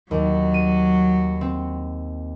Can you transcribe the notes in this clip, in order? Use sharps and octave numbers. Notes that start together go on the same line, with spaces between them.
D#2 F#3
D#7
C4